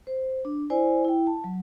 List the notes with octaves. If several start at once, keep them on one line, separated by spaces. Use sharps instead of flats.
C5
D4
E4 C5 D5 G#5
E4 G5
A5
F#3